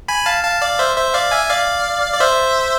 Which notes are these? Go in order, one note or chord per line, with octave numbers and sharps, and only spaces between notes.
G#5 B5
F5 A5
F5 A5
D5 F5
C5 E5
C5 E5
D5 F5
E5 G#5
D5 F5
D5
C5 E5